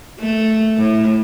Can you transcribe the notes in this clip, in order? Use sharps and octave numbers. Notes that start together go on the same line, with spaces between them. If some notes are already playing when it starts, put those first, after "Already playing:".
A3
A2